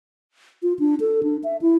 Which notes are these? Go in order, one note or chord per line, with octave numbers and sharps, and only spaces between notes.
F4
D4
A4
D4
E5
E4